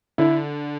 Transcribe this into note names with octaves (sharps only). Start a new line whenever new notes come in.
D3 E4